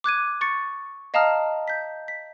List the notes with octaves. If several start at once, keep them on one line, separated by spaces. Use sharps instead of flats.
D6 F#6 G#6 D#7
C#6 A6 C#7
D#5 F5 A5 A#5 D#6 F6
G6 B6
B6